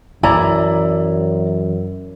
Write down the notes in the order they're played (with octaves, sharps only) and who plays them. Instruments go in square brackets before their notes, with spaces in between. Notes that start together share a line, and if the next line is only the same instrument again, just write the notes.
[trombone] F#2 [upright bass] E3 F#3 [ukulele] E4 D5 A#5